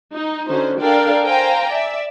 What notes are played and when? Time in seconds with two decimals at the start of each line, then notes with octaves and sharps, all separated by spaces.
0.13 D#4
0.48 D3 C#4 D#4 F#4 C5
0.80 D4 A4 A#4 D5 F5 G5
1.25 C5 F5 G5 G#5 A#5
1.69 D5 E5